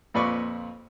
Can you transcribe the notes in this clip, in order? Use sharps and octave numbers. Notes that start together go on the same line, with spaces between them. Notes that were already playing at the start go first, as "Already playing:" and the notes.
F2 A#2 B4 D5 C#6